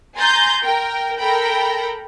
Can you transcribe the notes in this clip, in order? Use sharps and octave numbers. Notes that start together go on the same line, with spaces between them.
G#5 A#5 C6 G6 A6
A#4 G5
A4 A#4 G5 A#5 B5